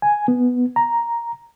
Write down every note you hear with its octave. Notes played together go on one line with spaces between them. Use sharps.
G#5
B3
A#5